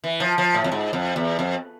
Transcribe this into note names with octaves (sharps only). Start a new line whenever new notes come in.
E3
F3
F3
A2
F2
G#2
F2
E2
F2